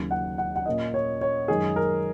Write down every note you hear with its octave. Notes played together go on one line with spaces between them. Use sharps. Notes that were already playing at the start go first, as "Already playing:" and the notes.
Already playing: D#2 C#3 F#3
F#5
F#5
F#5
A#2 A#3 C#4 D#5
C#5
C#5
F#2 D#3 G#3 D#4 G#4
A#4